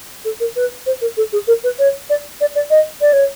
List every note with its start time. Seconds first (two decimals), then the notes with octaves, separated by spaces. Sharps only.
0.25 A4
0.40 A#4
0.56 B4
0.86 C5
1.01 A#4
1.17 A4
1.33 G#4
1.48 A#4
1.64 B4
1.79 C#5
2.10 D5
2.41 D5
2.55 D5
2.70 D#5
3.01 D5
3.13 C#5